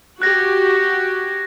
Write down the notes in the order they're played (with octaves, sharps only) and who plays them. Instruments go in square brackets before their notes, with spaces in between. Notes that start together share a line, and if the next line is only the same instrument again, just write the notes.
[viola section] F#4 G4 [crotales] F#6 G#6 A#6